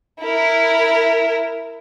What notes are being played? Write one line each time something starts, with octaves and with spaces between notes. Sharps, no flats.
E4 A#4